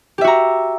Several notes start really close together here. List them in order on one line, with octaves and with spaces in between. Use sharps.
G4 E5 F#4 A#5